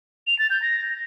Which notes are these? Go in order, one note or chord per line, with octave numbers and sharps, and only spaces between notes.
F7
A6
G6
A#6